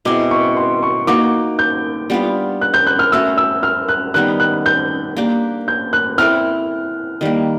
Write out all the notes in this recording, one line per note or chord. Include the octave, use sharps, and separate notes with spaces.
B2 G#3 C4 E4 D6
C#6
C6
C#6
A#3 D#4 F#4 D6
G6
G3 B3 D4 F4
F#6
G6
F#6
F6
A3 C#4 F#4 E6
E6
F6
F#6
D#3 G3 B3 D#4 F#6
F#6
G6
A#3 D4 G4
G6
F#6
C4 E4 A4 D5 F6
D#3 G3 A#3